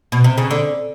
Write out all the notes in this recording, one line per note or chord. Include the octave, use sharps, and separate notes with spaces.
B2
C3
C#3
D3